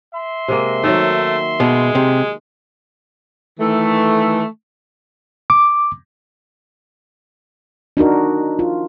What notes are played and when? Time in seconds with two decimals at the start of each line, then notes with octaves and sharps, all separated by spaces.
0.13 E5 C6
0.48 C3 G#3 A#3
0.84 D#3 F#3 A3
1.60 B2 G#3
1.95 C3
3.60 D#3 E3 A3
5.50 D6
7.97 D4 D#4 F#4 A#4
8.59 F4